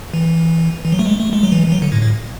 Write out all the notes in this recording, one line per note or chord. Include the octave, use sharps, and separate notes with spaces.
E3
E3
F#3
A3
G#3
A3
G#3
F#3
E3
E3
F#3
D3
A2
A2